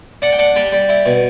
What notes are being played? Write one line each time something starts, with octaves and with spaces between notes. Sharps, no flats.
D4 F#5
G5
D4 F#5
G3 G5
G3
E4
B2